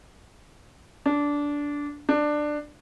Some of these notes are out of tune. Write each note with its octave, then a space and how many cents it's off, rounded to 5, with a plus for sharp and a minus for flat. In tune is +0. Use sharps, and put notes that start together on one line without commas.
D4 -15
D4 +15